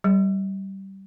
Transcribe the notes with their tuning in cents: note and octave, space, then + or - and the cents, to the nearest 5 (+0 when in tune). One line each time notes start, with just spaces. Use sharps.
G3 -20